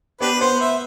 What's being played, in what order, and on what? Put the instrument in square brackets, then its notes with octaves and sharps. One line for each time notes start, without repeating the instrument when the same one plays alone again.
[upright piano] B3 [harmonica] D4 G4 B4
[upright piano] B3 [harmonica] C5
[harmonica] E5